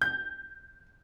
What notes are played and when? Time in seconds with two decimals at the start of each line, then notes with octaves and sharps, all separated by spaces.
0.02 G6